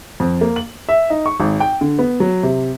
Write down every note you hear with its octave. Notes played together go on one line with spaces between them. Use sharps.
F2
A#3
F#7
E5
D#4
C#6
G#1
G5
D3
B3
F#3
C3